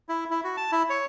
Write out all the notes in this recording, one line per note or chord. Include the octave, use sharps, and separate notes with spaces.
E4
E4
F#4
A5
E4
C#5